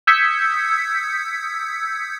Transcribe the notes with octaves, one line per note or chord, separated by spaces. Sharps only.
D#6 E6 G6 G#6 B6 C#7